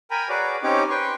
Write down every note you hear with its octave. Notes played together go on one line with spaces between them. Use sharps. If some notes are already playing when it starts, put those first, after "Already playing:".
A#4 G5 G#5 A#5 B5
F#4 G#4 B4 C#5 D5 D6
C4 C#4 D#4 G4 C#5 D6
B4 G5 C6 C#6